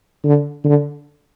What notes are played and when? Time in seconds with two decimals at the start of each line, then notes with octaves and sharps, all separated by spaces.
0.24 D3
0.65 D3